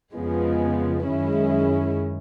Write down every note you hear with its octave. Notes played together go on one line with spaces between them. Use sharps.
F2 C#3 F3 G#3 B3
F#2 D#3 G#3 C#4 E4